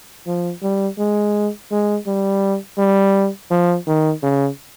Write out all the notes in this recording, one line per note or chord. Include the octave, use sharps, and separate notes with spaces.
F3
G3
G#3
G#3
G3
G3
F3
D#3
C#3